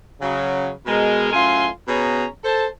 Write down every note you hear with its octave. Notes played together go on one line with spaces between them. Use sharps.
C#3 F#3
B2 G#3 A#4
F#2 A2 F4 G#5 C6
B2 B3 C#4 G#4 A#5
A4 C5 A5